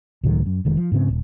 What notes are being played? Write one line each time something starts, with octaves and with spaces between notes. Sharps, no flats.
C#2 A2 D#3 F#3
F#2
F1 D#3 G#3
F3
G#2 C#3 C4
D#1